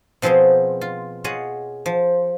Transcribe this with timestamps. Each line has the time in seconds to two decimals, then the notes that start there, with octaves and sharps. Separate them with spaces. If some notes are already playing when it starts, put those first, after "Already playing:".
0.22 B2 F3 C4 G#4 C6
0.81 F4
1.24 F4 G#4 C#5 D#5 F#5
1.86 F3